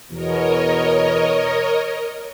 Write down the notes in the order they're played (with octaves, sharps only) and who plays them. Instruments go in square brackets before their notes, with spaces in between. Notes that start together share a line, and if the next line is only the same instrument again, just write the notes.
[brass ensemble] E2 B2 [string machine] A#4 C#5 D#5